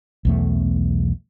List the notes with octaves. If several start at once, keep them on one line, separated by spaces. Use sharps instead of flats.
B1 E2 A3